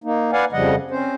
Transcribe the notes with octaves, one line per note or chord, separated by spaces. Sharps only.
A#3 D#4
B4 D5 F5 F#5 G#5
F2 C#3 F3 G3 D#5 F#5
C4 C#4 C5